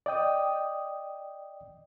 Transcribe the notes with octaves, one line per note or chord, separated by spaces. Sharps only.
D5 D#5 G5 D#6